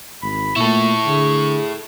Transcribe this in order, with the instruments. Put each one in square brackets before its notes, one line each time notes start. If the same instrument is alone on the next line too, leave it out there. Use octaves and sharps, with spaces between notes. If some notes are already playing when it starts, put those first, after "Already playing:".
[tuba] G#1 [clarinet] B5
[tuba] A#2 [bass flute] A3 [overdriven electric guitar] E4 A4 [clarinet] C#6
[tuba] D3 [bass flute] G#4